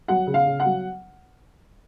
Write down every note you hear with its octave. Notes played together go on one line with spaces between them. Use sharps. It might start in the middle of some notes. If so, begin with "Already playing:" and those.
F#3 F#5
C#3
F5
C#3
F#5
F#3